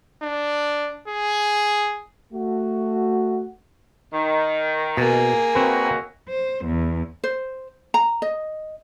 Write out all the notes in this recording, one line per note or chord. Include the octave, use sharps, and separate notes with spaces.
D4
G#4
A3 F#4
D#3
B2 A#3 G#4
D#2 C4 F#4 B4
C5
E2
C5
A#5
D#5